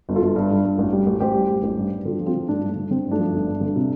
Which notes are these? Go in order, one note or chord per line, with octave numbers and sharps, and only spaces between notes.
G1
F4 A4
G1
G2
G2
G2
A1
G3
A1
A1 G4 C5
G3
A1
A1
G2
G2
D3 F4 A4
F3
C4 F4
D3
G2 A3 D4
G2
A3
D3
D3 C4
G2
A3 D4
F3
G1
G2
D3
C3